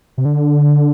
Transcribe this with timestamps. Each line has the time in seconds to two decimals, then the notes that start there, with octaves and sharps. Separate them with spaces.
0.18 C3
0.25 D3